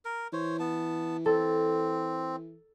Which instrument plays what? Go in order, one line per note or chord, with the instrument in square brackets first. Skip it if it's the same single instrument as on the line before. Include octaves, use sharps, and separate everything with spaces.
[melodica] A#4
[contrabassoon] E3 [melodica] C5 C#5
[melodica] B3 A5
[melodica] C4 [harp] A4